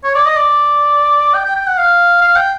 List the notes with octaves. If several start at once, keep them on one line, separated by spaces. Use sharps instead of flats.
C#5
D5
D#5
D5
G5
G5
G5
F#5
F5
F5
G5